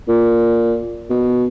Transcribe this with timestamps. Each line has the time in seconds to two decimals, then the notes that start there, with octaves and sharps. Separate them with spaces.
0.08 A#2
1.10 B2